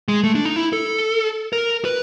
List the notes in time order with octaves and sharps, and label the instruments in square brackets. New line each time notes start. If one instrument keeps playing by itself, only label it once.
[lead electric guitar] G#3
A3
D4
D#4
E4
A4
A#4
B4